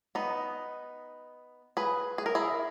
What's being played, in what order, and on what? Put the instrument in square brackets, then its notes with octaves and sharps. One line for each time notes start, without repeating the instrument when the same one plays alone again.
[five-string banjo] B3 D#4
G#4 B4
G#4
A#4
E4 G#4